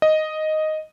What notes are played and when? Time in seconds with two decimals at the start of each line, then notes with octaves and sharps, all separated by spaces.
0.02 D#5